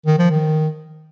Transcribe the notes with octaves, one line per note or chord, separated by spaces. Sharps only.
D#3
F3
D#3